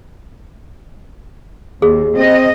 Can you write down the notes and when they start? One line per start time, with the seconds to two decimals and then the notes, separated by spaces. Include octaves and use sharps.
1.82 D#2 G#4
2.16 C4 D#5